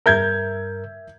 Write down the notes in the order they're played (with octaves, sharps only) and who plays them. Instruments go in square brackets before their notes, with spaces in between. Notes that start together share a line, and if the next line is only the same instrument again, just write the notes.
[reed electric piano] G2 A#4 [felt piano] E5 G6 G#6